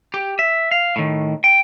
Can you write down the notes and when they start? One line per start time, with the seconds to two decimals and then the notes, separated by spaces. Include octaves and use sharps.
0.14 G4
0.39 E5
0.71 F5
0.96 A2 D#3
1.44 G5